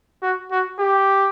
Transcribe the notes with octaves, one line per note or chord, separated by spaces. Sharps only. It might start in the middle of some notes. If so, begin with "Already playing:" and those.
F#4
F#4
G4